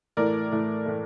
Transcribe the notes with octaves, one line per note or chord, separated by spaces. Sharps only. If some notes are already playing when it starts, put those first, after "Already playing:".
A2 E3 A3 A#4 D5
A2 E3 A3
A2 E3 A3